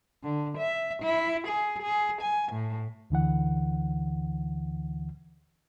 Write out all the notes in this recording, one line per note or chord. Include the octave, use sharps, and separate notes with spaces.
D3
E5
E4
G#4
G#4
G#5
A2
D2 D3 E3 F#5